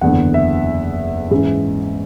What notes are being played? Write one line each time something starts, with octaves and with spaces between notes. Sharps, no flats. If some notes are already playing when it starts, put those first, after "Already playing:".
F#1 E2 D3 F#5
E5
G#2 E3 G#3 C#4